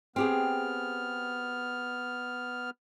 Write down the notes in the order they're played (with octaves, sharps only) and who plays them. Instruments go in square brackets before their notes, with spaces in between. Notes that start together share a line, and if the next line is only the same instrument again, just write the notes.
[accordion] B3 F6 [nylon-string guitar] C4 G4 G#4